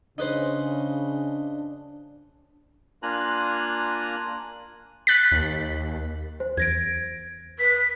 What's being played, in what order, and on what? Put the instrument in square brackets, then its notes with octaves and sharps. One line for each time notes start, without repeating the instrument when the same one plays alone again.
[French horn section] C#3 [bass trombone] D4 [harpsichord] D#4 B4 C5
[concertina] A#3 D4 F4 G#5 A#5 F#6
[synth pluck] F#6 A6 B6
[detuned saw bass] D#2
[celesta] C5
[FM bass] E2 [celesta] G#6 A#6 D7
[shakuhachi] B4 [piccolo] B6